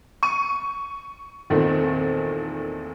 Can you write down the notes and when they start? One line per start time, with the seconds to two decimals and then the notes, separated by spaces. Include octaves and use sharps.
0.23 C#6 D#7
1.50 E2 A#2 D#3 A3 C4